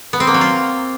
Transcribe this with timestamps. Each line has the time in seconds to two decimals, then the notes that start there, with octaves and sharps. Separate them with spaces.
0.13 B3
0.20 C4
0.27 A#3
0.34 F#3
0.41 F4